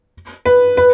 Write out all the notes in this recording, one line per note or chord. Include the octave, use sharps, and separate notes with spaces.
B4
B4